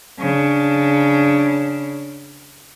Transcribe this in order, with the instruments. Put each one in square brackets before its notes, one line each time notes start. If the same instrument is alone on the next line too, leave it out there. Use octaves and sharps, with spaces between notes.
[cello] C#3 D4